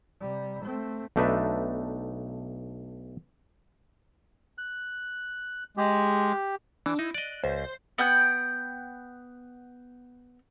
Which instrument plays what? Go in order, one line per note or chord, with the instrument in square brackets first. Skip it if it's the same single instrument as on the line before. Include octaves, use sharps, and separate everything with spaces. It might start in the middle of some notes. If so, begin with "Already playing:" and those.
[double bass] C3 G3
A3 C4
[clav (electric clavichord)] B1 A3 D4 D#4 B4 E5
[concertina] F#6
[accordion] G#3 [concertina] G4
[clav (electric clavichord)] E3 [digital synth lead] D4
[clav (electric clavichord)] D#4 [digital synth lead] E4
[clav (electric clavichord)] D5 D#5 [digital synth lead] F#6
[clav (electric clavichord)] C#2 [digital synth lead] C5
[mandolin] B3 F#5 G5 G6